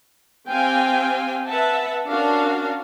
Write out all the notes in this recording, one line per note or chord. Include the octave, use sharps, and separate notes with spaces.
C4 G4 F5 G5 G#5
B4 E5 F#5 A5
C#4 D4 F#4 A#4 F5